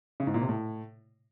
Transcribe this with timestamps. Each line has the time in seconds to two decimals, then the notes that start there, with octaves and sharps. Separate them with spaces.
0.20 C#3
0.27 G#2
0.34 A#2
0.41 C3
0.48 A2